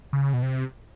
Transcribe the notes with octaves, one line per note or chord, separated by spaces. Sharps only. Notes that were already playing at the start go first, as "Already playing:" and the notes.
C#3
B2
C3